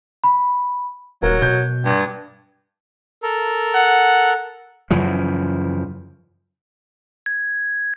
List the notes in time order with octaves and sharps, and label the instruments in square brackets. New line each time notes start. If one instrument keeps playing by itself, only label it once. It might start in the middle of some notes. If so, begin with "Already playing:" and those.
[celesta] B5
[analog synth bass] D#1 [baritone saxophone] F#3 [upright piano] A#4
[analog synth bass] B2 [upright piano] G6
[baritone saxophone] G2
[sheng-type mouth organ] A4 A#4
[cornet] F#5
[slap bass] F#2 C#3 E3 F3
[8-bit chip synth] G#6